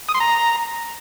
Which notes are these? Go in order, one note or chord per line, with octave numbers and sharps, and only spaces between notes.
D#6
C6
A#5